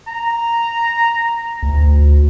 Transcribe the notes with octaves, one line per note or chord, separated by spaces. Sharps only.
A#5
D2